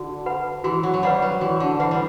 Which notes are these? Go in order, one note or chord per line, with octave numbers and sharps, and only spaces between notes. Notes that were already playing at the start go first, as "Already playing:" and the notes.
Already playing: D3 F#4
B4 F#5 B5
E3 F#4
F#3
F#3
G3 B4 F#5 B5
F#3
E3 F#4
D3
E3 B4 F#5 B5
G3